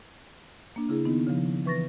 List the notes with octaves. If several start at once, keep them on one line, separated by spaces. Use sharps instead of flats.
A#3 D4
C#3 E4 G#4
D#3 B3 D#4
C#3 F3
E3 B4 C#6 A6 A#6